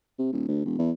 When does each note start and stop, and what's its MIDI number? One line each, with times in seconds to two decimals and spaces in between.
0.19 0.29 48
0.32 0.46 27
0.48 0.61 38
0.65 0.75 28
0.78 0.91 40